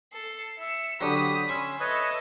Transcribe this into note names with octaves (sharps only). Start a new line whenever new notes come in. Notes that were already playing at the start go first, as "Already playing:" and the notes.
A4 C7
E5 C#7 E7
D3 F#3 G4 C5 B5 D#6
C#4 C6 C#6 E6
A4 B4 C#5 D#5 E5 D#6